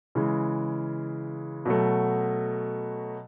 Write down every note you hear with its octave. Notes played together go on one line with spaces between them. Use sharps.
C#3 E3 G#3
B2 F#3 A3